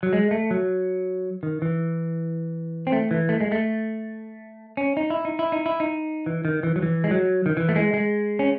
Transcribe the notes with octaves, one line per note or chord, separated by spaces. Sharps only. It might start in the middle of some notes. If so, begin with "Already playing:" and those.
F#3
G#3
A3
F#3
D#3
E3
C4
A3
E3
A3
G#3
A3
C#4
D#4
E4
D#4
E4
D#4
E4
D#4
E3
D#3
E3
F#3
E3
G#3
F#3
D#3
E3
A3
G#3
G#3
C#4